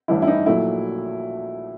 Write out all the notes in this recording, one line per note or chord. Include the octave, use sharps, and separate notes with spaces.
A1 G2 E3 G3 E4
E4
D#4
A#1 A#2 F#3 A3 E4